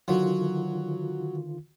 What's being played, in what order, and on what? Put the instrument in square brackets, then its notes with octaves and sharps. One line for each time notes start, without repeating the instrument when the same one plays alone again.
[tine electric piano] D3 D#3 F4 [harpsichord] F#3